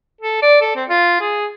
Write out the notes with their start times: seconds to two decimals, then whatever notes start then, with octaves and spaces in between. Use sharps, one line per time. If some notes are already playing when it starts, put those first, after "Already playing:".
0.21 A4
0.42 D5
0.61 A4
0.76 C4
0.89 F4
1.20 G#4